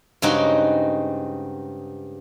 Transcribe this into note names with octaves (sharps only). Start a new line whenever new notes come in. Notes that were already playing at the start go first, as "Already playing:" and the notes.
G2 C#3 G#3 C4 D#4 F#4